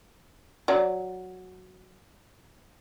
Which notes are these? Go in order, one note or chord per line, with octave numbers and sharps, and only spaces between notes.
F#3 D5